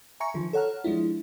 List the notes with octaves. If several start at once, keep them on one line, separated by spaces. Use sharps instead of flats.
E5 G#5 A#5 C#6 C#7
D3 D#3 F3
A4 C#5 F#5 A#5 F6
F3 G#3 D4 E4